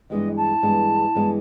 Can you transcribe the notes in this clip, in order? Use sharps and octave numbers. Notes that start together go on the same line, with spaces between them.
G2 E3 G#3 B3 D4 D#5
A5
G2 E3 G#3 B3 D4
G2 E3 G#3 B3 D4